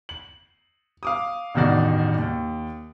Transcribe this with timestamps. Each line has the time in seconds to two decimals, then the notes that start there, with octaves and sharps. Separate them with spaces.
0.09 F#7
1.03 F5 D6 D#6
1.54 A1 E2 G2 D#3 F#4 D5
2.18 D#2